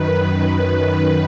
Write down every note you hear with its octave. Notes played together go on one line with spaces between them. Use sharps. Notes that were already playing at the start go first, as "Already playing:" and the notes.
Already playing: F#2 D#3 B4
F#2 D#3 B4